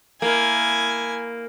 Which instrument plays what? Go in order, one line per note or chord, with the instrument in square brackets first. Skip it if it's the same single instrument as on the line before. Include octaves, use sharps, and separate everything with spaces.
[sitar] A#3 [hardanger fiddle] E4 G#5